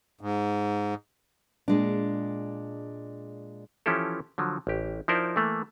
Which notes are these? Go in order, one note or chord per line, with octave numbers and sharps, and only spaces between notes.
G#2
A#2 G#3 D4
E3 F3 C#4 E4 G4 A4
D3 F3 F#3
A1 G4
F3 D#4 E4 A#4 C5 D5
E3 A3 A#3